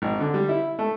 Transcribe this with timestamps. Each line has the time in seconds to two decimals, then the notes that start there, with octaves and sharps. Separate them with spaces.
0.02 G#1
0.20 D3
0.34 G3
0.49 E4
0.79 A3